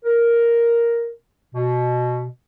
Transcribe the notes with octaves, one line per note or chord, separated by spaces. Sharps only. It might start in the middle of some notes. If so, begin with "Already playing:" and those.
A#4
B2